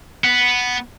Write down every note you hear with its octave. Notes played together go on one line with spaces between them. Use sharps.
B3